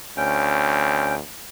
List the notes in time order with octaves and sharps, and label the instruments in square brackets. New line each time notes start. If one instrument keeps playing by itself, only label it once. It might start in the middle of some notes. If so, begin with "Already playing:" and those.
[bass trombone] D2 [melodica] C#4 G5